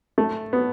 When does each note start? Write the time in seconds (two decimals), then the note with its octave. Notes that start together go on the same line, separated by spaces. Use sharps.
0.18 A3
0.53 B3